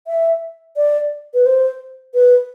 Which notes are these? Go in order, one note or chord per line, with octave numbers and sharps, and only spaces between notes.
E5
D5
B4
C5
B4